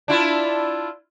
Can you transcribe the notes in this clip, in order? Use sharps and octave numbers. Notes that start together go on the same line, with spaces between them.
D4 E4 F4